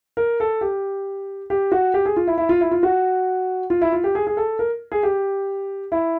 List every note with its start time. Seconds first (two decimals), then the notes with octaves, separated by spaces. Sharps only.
0.17 A#4
0.40 A4
0.61 G4
1.50 G4
1.72 F#4
1.94 G4
2.05 G#4
2.16 F4
2.27 E4
2.38 E4
2.49 F4
2.61 E4
2.71 F4
2.83 F#4
3.70 F4
3.82 E4
3.92 F4
4.04 G4
4.15 G#4
4.27 G#4
4.37 A4
4.59 A#4
4.92 G#4
5.03 G4
5.92 E4